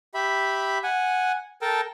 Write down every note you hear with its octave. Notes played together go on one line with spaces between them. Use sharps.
G4 E5 B5
F#5 G#5
A4 A#4 G5 A5